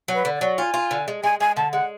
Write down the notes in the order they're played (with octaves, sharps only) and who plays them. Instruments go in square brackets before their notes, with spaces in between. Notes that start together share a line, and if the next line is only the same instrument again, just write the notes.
[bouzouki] F#3
[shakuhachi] B4
[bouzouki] D3
[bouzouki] F#3 [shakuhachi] D5
[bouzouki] F4 [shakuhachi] G#5
[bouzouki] F4
D3
G#3
[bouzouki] G#3 [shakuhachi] G#5
[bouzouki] G#3 [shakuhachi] G#5
[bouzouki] D3 [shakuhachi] A5
[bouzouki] G#3 [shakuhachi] F#5